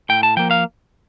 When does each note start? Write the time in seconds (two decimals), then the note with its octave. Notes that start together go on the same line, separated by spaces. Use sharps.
0.09 A2 G5
0.23 A5
0.37 F3 A#3 G5
0.51 F5